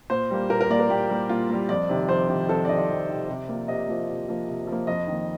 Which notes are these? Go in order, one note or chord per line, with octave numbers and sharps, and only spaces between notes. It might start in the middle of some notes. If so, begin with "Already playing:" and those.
A#2 C5
G3 A#3
A#2 A#4
A#4
G3 A#3 D5
A#4
A#2 G4
G3 A#3
A#2 F4
G3 A#3
F2 D5
C3 D#3
F2 C5
C3 D#3
F2 A4
D5
C3 D#3 D#5
D5
F2
C3 D#3
C3
F3 A#3
C3 D#5
F3 A#3
C3
F3 A#3
C3
F3 A#3
F2 D#5
D#3 A#3